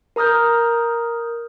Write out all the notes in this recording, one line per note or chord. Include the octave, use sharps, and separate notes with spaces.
A#4 A#5 D#6 F6 G6